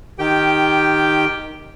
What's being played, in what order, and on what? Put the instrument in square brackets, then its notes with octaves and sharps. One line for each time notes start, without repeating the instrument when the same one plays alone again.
[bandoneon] D#3 G4 G5